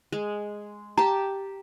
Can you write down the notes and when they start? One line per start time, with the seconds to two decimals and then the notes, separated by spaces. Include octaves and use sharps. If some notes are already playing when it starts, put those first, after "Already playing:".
0.12 G#3
0.98 G4 A5 A#5